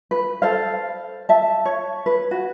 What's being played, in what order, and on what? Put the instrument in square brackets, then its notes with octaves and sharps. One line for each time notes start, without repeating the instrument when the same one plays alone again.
[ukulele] B4
A4 C5 F5
E5 A5
C#5
B4
F#4